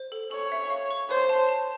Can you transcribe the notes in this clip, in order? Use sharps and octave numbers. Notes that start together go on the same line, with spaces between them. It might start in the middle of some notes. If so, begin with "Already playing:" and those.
Already playing: C5
A4
A4 C#5
E5
F5
C#6
C5 C#5
A5
A5